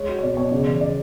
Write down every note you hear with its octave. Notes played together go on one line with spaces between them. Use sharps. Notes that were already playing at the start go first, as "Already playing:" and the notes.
Already playing: G#3 C#5
F#4
C#5
B2 D5
B2 C#5
C#3 D5
E3 D5
C#3 D5